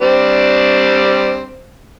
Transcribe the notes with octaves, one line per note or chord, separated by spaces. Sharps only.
G3 C4 D4